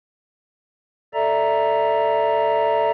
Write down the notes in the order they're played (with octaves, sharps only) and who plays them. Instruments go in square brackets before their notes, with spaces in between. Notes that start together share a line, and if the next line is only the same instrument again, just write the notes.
[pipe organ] A4 D5 E5 A#5